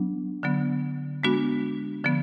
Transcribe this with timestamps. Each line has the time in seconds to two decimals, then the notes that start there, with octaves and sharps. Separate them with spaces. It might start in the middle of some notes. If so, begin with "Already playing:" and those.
Already playing: F#3 B3 D4
0.43 D3 F#3 B3
1.23 G#3 B3 D4 F#4
2.04 D3 F3 B3